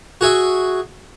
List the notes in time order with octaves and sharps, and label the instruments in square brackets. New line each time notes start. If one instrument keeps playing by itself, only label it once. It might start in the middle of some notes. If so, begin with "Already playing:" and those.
[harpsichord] F#4 G#4 E5